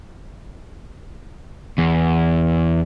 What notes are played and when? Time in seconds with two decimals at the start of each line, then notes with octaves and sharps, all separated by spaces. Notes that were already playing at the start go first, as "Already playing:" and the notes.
1.78 E2